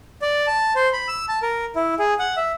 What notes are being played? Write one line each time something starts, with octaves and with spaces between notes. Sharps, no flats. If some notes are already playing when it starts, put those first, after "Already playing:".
D5
A5
C5
B5
E6
A5
A#4
E4
G#4
F#5
E5